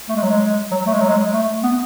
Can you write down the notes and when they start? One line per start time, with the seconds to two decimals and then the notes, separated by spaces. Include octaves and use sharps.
0.09 A3
0.16 G#3
0.23 F#3
0.30 G#3
0.71 F#3
0.87 A3
0.93 G#3
1.01 F#3
1.09 G#3
1.33 A3
1.63 B3